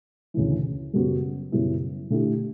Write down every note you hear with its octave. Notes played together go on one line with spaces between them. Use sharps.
D2 C#3 E3
F#2 C#3 G3 B3 F#4
F#2 C#3 G3 B3 E4
D3 A3 E4 G4